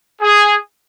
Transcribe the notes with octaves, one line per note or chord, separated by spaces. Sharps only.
G#4